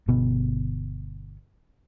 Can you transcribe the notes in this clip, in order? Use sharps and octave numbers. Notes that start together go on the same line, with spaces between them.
G1 B2 B3